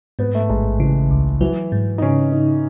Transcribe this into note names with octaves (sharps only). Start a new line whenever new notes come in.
G#2 B3
A3
A1 G#3
C#3 E3
C#2
E3 F#3
G#2
D#4
C#3 C#4
D#4